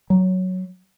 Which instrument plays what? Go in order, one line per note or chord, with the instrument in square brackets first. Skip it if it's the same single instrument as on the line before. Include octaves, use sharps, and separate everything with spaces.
[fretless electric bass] F#3